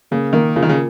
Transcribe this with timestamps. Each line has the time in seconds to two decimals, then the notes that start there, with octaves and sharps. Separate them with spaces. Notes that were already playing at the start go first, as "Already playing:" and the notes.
0.11 C#3 A#3
0.33 D#3 A#3
0.56 C#3 F4
0.63 D#3
0.69 C#3